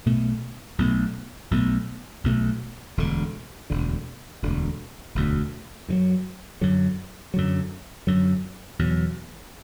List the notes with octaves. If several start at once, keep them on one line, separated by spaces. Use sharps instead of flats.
B1 B2 A3
B1 B2 A3
B1 B2 A3
B1 B2 A3
E1 D2 D3
E1 D2 D3
E1 D2 D3
E1 D2 D3
F#2 D3 F#3
F#2 D3 F#3
F#2 D3 F#3
F#2 D3 F#3
E2 B2 F#3